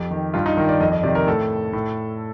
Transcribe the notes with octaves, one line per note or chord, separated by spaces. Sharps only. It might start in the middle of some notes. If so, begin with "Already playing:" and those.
Already playing: F2 G4
D#3
G2 F4
D#4
D#3 A#4
D5
F2 D#5
D#5
C3 D#3 D5
A#4
A2 A4
A2